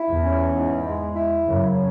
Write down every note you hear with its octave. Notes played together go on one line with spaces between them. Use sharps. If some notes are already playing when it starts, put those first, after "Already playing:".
Already playing: E4
E2
C#4
G#2
G#3
E4
F#2 C#3